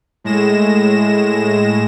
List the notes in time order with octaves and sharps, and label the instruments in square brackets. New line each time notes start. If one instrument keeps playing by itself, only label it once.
[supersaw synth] A2 G#3 A#6 E7